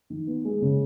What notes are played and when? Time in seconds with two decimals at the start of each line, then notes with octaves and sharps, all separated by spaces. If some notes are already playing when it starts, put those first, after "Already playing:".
0.10 D#3
0.27 B3
0.45 G#3
0.62 C#3